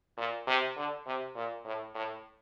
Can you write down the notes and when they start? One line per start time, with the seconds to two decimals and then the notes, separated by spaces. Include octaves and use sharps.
0.18 A#2
0.47 C3
0.76 D3
1.06 C3
1.36 A#2
1.65 A2
1.94 A2